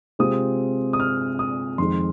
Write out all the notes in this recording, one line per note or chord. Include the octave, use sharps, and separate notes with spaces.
C3 G#3 C4 F4 D#6
D#6
F6
D#6
F2 D#3 G#3 C6